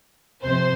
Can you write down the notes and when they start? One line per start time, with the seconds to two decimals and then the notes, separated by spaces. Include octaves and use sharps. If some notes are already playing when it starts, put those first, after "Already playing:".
0.44 F2 C3 C5